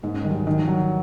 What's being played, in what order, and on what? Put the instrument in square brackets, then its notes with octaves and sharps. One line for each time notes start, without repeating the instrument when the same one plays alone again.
[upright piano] G#2 [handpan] A#3
[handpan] C#4
[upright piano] D#3 [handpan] G3
[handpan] F#3
G3
[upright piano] D#3 [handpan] F#3
[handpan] F3
[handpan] E3 [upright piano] F#3
[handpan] D#3